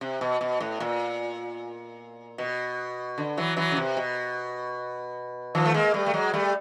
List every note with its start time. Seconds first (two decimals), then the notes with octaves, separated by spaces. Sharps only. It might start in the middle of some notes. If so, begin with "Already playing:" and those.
0.01 C3
0.21 B2
0.41 B2
0.60 A2
0.80 A#2
2.38 B2
3.18 D3
3.37 E3 F#3
3.57 E3 F#3
3.71 C#3
3.77 C3
3.97 B2
5.55 D#3 F3
5.66 A3
5.74 G#3 A#3
5.94 G3 A3
6.06 A3
6.14 F#3 G#3
6.33 G3 A3